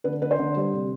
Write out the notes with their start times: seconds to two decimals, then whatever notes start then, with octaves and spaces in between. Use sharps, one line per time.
0.04 D3 B4
0.22 D3 B4
0.31 C5
0.39 D3
0.56 G3
0.73 C3